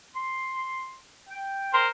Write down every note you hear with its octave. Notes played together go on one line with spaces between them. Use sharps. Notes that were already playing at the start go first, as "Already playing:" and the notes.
C6
G5
A#4 C5 C6